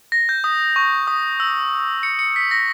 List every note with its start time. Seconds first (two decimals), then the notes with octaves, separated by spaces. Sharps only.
0.12 A#6
0.29 G6
0.44 D#6
0.76 C#6
1.07 D#6
1.40 E6
2.03 C#7
2.19 C#7
2.36 B6
2.51 A#6